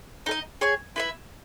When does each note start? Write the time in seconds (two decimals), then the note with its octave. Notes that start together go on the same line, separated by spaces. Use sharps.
0.26 D#4 A4
0.31 D#5
0.61 G#4 C#5 G#5
0.96 E4 B4 E5